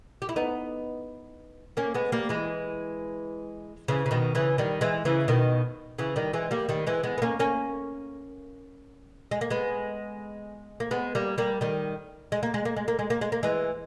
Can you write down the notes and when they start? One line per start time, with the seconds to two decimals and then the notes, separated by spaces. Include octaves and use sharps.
0.22 G4
0.29 E4
0.36 B3 D#4
1.77 A#3 C#4
1.94 G#3 B3
2.12 G3 A#3
2.29 E3 G#3
3.88 C#3 E3
4.06 C#3
4.11 B2 D#3
4.35 C#3 E3
4.58 D#3 G3
4.81 E3 G#3
5.05 C#3 E3
5.28 B2 D#3
5.98 C#3 E3
6.16 D#3 G3
6.33 E3 G#3
6.51 G3 A#3
6.69 D#3 G3
6.87 E3 G#3
7.03 G#3 B3
7.18 B3
7.22 A#3 C#4
7.39 A#3 C#4
9.31 G#3
9.41 A#3
9.50 G#3 B3
10.80 A#3
10.91 G#3 B3
11.15 G3 A#3
11.38 G3 A#3
11.61 D#3 G3
12.32 G#3
12.43 A#3
12.54 G#3
12.65 A#3
12.76 G#3
12.88 A#3
12.99 G#3
13.10 A#3
13.21 G#3
13.32 A#3
13.43 E3 G#3